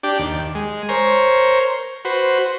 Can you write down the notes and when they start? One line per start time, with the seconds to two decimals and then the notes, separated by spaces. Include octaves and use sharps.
0.03 D4 G4
0.19 D#2
0.55 G#3
0.89 A#4 C5 C#5
2.05 F#4 B4 C5